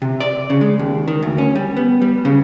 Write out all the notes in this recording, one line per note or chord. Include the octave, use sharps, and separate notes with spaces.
C3
D5
C#3
G#3
D#2
D#3
D2
C#4
G3
B3
G3
C#3